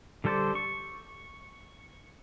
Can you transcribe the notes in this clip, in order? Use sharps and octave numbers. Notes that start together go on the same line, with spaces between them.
D3 G3 A4 C5 D5
C#6